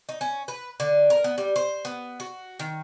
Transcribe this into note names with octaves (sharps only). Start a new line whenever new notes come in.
D#4
C#4
B4
D3
A#4
B3
G3
C5
B3
F#4
D#3